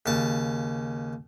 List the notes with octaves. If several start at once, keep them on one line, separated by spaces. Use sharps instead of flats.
D#2 C#3 A5